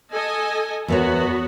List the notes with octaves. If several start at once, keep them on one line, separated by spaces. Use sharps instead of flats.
A4 D#5 G#5
E2 B3 F#4 A#4 C#5